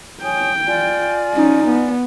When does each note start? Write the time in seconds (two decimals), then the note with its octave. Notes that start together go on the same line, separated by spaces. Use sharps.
0.23 C#5 G5 G#5 D#6
0.66 F4 D5 G#5
1.34 C#4 D#4
1.68 B3